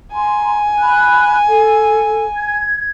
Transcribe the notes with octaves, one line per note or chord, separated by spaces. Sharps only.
G#5 A#5 C6
B5 F#6
A4
G#6